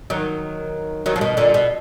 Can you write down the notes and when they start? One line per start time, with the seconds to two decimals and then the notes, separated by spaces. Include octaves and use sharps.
0.10 D#3 F#3
1.06 D#3 F#3
1.16 F3
1.21 B2 D#3
1.37 A#2 D3
1.54 B2